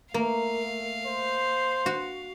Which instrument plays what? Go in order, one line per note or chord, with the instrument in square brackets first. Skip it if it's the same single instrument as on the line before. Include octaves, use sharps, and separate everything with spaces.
[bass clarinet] A3 [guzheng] A#3 [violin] F5
[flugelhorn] C5
[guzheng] F#4